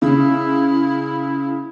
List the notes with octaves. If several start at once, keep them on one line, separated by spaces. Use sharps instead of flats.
C#3 E4